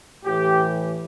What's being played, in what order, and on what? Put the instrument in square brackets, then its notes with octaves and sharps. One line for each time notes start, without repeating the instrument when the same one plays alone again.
[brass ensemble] A2 E3 G4